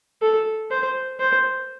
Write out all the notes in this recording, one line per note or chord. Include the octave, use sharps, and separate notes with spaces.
A4
C5
C5